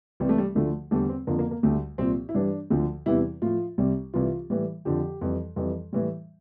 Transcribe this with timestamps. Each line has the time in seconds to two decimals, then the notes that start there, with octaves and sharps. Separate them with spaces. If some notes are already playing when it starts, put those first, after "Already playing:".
0.20 C2 C3 E3 G3
0.29 A3
0.38 G3
0.55 D2 D3 F3 A3
0.91 E2 D3 G3 A3
1.09 C4
1.27 F2 D3 F3 A#3
1.39 A#3
1.51 A#3
1.63 D2 D3 G3 A3
1.98 C2 A#2 F3 C4
2.29 E4
2.35 G2 E3 G3 D4
2.70 D2 D3 F3
3.06 E2 C3 E3 G3 E4
3.42 A2 F3 F4
3.78 C2 C3 G3
4.14 C2 C3 E3 F4
4.50 A2 E3 G3
4.85 F2 D3 F3 G4
5.21 F2 E3 G3
5.56 F2 E3 G3
5.93 A2 E3 G3